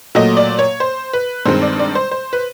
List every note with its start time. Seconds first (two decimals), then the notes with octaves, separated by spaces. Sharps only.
0.15 A#2 F#3 A3 D#5
0.37 D5
0.59 C#5
0.80 C5
1.13 B4
1.46 G2 D#3 G#3 C4 C5
1.62 D5
1.79 D5
1.95 C5
2.11 C5
2.33 B4